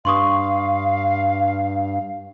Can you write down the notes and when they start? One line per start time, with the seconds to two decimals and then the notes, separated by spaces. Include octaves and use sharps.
0.05 G2 F5 C6 C#6 D#6